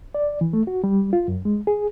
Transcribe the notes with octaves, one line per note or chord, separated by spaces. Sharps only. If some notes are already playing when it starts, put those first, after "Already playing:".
D5
E3
A3
F#4
G3
F4
F#2
G#3
G#4